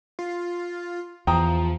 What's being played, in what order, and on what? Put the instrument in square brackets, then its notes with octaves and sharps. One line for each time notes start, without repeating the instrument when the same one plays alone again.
[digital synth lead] F4
[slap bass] E2 [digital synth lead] F3 [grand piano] G5 A#5 D#6